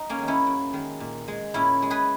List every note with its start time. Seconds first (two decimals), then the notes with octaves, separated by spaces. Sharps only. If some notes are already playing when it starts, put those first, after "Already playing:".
Already playing: D#4
0.10 A#3 C#4
0.19 D#3 G#3
0.28 C#4 E4
0.47 F#2
0.73 D#3 G#3
1.00 A#2
1.28 G#3
1.54 A#2 C#4 E4
1.82 G#3
1.90 G#4 B4